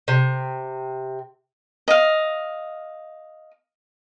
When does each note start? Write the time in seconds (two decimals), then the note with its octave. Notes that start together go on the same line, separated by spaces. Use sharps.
0.08 C3
1.88 D#5 F5